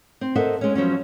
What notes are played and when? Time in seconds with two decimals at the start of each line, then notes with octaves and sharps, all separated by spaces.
0.21 C4
0.35 A4 A#4 C5 D#5 E5 F#5
0.61 G#3 C#4
0.75 F3 F#3 B3 C#4